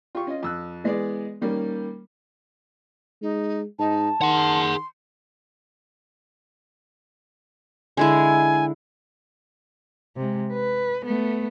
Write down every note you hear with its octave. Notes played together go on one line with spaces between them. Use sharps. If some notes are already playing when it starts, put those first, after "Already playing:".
F4 G4 C#6
C#4 F4 D#5
F2 E6 F#6
E3 G#3 B3 G#4 D5
D#3 G3 A#3 C#4
G#3 D#4
G#2 D#4 A5
D#3 G#4 F#5 C6
D3 G#3 E4 G#5
C3 G#3
B4
A3 B3